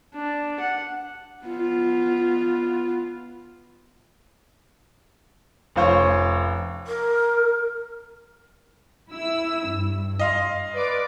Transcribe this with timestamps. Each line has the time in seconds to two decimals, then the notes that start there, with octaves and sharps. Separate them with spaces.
0.15 D4
0.60 F#5
1.46 B3 F4
5.76 F1 C#4 F4 C5 C#5 C#6
6.87 A#4
9.11 E4 E6
9.69 G2
10.19 D#5 F5 C6
10.73 B4 D5 D6